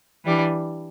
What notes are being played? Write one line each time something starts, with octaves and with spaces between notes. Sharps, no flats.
E3 G3 D4